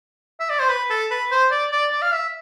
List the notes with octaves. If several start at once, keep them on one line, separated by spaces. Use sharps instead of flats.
E5
D5
C5
B4
A4
B4
C5
D5
D5
D5
F5
E5